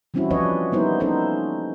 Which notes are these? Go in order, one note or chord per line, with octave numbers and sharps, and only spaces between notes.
E3 G3 C4 C#4 E4 F#4
F3 C4 D4 B4 C#5 D#5
G3 A#3 B3 D#4 E4 C5
B3 C#4 D#4 A4 C5